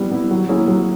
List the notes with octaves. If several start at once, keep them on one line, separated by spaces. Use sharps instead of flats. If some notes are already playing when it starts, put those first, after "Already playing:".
Already playing: G3 B3 E4
B3 E4
F#3
A#3 C#4 E4 G#4
F#3